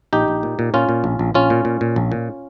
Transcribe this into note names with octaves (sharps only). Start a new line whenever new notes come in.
A#1 D#4 G4
A#1
A#2
A#2
A#2 C#4 F4
A#2
A#1
A#1
A#1 C#4 F4
A#2
A#2
A#2
A#1
A#2